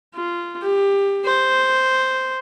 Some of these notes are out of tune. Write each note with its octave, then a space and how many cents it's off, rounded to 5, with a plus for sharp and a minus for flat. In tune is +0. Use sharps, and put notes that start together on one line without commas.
F4 -15
G4 +20
C5 -5